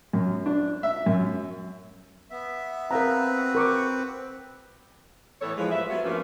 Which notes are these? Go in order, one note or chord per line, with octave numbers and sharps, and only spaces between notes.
F#2
D4
E5
F#2
B3 E5
C4 A#4 B4 F5 A#5
F#4 F#5
A#4 C#6 D6
A2 E3 B3 A4 C#5
E3 F3 G#3
A2 G3 B4 E5
F#3 B3 F4 C#5
G2 F3 A3 A#3 C#4 B4